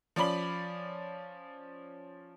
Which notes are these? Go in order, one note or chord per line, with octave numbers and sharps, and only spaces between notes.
F3 C#4 D5 B5 F#7